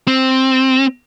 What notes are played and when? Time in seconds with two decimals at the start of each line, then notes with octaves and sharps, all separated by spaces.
0.08 C4